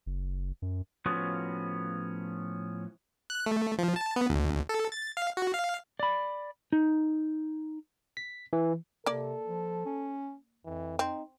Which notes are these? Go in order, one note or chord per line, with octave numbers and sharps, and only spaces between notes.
F#1
F#2
A2 F3 B3 C#4 F4 F#4
F#6
A3
F3
A5
B3
D2
A4
A6
F5
F#4
F5
D5 B5
D#4
B6
E3
C3 A#3 A4 D5
F3
C#4
F2 E3
C4 D#4